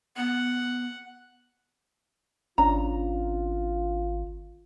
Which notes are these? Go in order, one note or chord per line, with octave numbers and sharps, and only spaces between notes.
B3 F#5
G#1 C#4 D4 F4 A#5